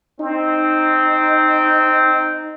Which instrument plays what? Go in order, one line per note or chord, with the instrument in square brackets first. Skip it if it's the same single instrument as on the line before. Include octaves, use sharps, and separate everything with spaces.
[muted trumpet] C4 [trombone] D#4